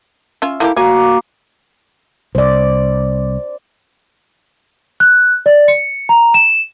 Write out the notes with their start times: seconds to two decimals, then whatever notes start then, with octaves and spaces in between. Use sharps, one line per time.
0.42 C#4 F4 E5
0.60 A3 A#3 E4 G4
0.76 A#3 F#4 C#5 G#5
2.35 C2 C5 D5
5.00 F#6
5.46 D5
5.68 C#7
6.09 A#5
6.34 E7